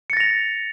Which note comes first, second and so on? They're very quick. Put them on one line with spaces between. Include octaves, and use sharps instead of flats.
C#7 A6 A#6 F7